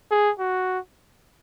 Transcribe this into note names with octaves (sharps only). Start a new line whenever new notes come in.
G#4
F#4